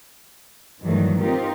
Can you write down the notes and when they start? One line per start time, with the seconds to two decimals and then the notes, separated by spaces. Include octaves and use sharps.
0.83 G2 D#3 E3 F#3 A3
1.19 C4 D#4 F4 G4 A#4